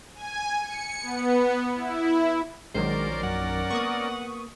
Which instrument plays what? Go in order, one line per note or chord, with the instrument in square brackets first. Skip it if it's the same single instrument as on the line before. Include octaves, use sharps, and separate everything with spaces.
[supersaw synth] G#5
C#7
B3
E4
[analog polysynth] A#1 D#3 F#3 [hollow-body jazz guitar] G#3 [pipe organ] C#4 A#4 D5 [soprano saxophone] C5
[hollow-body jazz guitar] F#2 [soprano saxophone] F#5
[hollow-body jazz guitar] A#3 B3 [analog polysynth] C#6 D#6